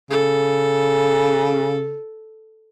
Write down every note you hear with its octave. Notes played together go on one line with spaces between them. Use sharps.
C#3 A4